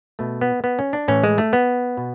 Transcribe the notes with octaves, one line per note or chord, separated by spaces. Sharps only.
B2 A3
B3
B3
C#4
D4
A2 E3 C#4
G#3
A3
B3
B2